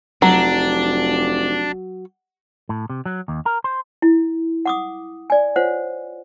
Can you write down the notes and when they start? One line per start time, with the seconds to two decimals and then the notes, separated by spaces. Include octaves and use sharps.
0.22 F1 F#3 D4
2.69 A2
2.90 C3
3.06 F#3
3.28 D#2
3.46 A#4
3.64 C5
4.02 E4
4.66 F#5 D6 D#6
5.30 D5 G#5
5.56 F4 C5 C#5 F#5